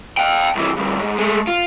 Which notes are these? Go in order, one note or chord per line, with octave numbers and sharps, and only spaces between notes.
F5 G5
C2 E3
D2 G2
G#2
G#3 A3
F4